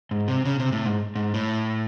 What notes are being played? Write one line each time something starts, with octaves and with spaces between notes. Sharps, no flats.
G#2
C3
C#3
C3
A2
G#2
G#2
A2